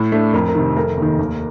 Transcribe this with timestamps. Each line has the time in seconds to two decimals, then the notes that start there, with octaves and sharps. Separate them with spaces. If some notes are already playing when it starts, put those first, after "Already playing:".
Already playing: A2
0.12 A3 D4
0.33 F2 A#4
0.48 A#4
0.55 C3 D#3
0.76 F1 A#4
0.97 D#2 D#3
1.19 D#2